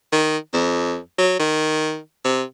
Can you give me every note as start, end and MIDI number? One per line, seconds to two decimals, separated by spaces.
0.12 0.37 51
0.54 0.98 41
1.18 1.36 54
1.39 1.98 51
2.25 2.43 48